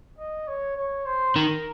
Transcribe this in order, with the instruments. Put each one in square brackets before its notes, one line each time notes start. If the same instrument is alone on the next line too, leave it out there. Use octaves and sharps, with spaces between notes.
[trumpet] D#5
C#5
C#5
C5
[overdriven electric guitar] D#3 [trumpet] A#4